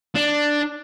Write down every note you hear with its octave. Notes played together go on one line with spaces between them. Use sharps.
D4